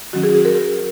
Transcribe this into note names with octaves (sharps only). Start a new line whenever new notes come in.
D#3 F#3 C#4 F#4
G#4
G#4
A#4
A#4